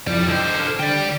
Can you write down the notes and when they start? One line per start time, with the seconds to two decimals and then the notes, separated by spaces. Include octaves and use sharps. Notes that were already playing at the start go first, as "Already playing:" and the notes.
0.07 F2 F3 G3 E4 D5
0.28 D3 C5 D#5 G5
0.60 A4 F6
0.79 D3 D5 G5